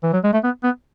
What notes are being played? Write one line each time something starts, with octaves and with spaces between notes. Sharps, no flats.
E3
F#3
G#3
A3
B3
B3